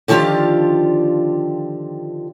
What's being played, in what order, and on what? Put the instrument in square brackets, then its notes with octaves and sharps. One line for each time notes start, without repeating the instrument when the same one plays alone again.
[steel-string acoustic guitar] D3 D#3 F3 F4 G4 D5